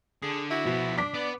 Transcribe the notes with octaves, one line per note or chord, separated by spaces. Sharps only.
D3 G#4
E4 F#4
B2 F3 B3
D4 D6 B6
B3 D5